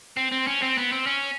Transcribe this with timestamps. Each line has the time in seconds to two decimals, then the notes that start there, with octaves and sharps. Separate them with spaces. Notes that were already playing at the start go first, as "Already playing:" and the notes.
0.17 C4
0.32 C4
0.47 C#4
0.62 C4
0.78 B3
0.92 C4
1.07 C#4